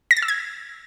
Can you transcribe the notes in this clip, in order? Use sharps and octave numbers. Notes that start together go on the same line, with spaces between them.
A#6
A6
E6
G#6